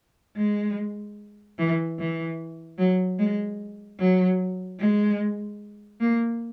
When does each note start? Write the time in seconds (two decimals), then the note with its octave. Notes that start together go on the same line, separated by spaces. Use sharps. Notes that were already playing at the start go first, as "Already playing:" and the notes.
0.36 G#3
1.58 E3
1.97 E3
2.78 F#3
3.19 G#3
3.98 F#3
4.78 G#3
6.00 A#3